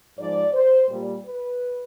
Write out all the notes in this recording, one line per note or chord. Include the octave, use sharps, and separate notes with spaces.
G#2 F3 G#3 D5
C5
A#2 G3
B4